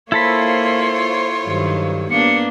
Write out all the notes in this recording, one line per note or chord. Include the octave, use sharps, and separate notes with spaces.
A#3 E4 F4 A4 C5 C#5 B5 C6
G2 D#3 F#3
A#3 B3 D4 C#7